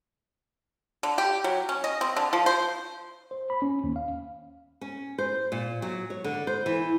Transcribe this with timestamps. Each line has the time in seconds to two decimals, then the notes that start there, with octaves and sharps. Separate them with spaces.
1.03 D3
1.18 G4
1.44 F#3
1.69 C#4
1.84 D#5
2.01 C4
2.16 D3
2.33 F3
2.46 C5
3.31 C5
3.50 B5
3.62 C#4
3.84 D#2
3.96 F5
4.81 C#4
5.18 C5
5.52 A#2
5.82 F#3
6.10 C#5
6.24 D3
6.47 C5
6.66 E3